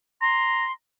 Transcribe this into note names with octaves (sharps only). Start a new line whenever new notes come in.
A#5 C6